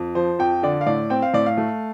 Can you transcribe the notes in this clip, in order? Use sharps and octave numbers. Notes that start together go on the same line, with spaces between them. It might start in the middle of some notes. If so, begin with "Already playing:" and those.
Already playing: F2
F3 C5
F2 G5
D3 D5
F5
A2 D5
C4 G5
F5
A2 D5
F5
A3